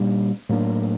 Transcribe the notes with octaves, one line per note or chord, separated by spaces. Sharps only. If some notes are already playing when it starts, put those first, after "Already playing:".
Already playing: A#2 G3 D4
A2 F#3 A#3 D4